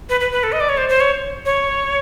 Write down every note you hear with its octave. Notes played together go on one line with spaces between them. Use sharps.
B4
B4
B4
A4
D#5
D5
C#5
C5
C5
C#5
C#5